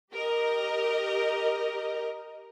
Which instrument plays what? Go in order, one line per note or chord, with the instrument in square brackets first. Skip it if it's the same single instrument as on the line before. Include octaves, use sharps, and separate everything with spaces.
[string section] G4 A#4 D#5